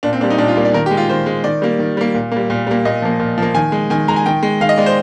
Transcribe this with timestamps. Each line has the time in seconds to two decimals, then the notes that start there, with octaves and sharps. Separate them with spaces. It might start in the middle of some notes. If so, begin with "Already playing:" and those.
0.03 A#2 D4
0.13 C4
0.21 G3 A#3 D4
0.30 D#4
0.38 A#2 D4
0.48 F4
0.57 G3 A#3
0.65 D5
0.74 D#3 A#4
0.86 G4
0.91 G#3
0.97 F4
1.09 D#3 C5
1.26 G#3
1.44 D#3 D5
1.62 G3 A#3
1.79 D#3
1.97 G3 A#3
2.14 A#2
2.32 G3 A#3
2.50 A#2
2.67 G3 A#3
2.85 A#2 D#5
3.02 F3 A#3
3.19 A#2
3.38 F3 A#3
3.54 D#3 G#5
3.72 G#3
3.90 D#3 G#5
4.08 G#3 A#5
4.16 G#5
4.26 D#3 G5
4.43 G#3
4.61 D#3 F5
4.69 D#5
4.78 G#3 D5
4.86 C5